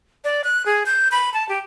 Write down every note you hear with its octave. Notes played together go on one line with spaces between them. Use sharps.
D5
F#6
G#4
G6
B5
A5
G4